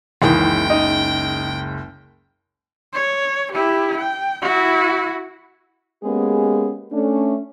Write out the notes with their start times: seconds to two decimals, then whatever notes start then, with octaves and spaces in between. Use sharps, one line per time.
0.22 F#1 C#2 D#3 E3 G5
0.70 D#4 D#5
2.93 C#5
3.52 E4 G4
3.97 G5
4.42 E4 F#4
6.04 G#3 A#3 B3 C#4 G4 G#4
6.93 A3 C#4 D4